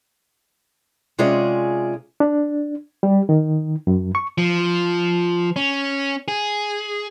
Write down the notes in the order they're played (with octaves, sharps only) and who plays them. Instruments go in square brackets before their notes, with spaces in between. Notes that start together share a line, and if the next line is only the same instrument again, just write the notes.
[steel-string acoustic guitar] C3 G#3 C#4 F4 G#4 D5
[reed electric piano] D4
G3
D#3
F#2
C#6
[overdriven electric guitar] F3
C#4
G#4